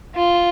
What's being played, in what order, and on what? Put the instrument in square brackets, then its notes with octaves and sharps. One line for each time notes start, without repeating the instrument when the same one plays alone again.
[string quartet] F4